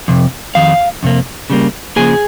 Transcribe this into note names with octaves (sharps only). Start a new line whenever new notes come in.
F2 C3
F2 D#3 F5
F2 C3 A#3
C#3 G3 A#3
C#3 F3 A#3 G#4 G#5